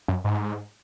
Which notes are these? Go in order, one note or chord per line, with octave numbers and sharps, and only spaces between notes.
F#2
G#2